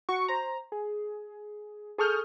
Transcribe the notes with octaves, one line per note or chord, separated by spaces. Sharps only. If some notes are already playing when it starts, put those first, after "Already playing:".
F#4 C#6
C5 A#5
G#4
G#4 A4 C#6 D#6 F6 G6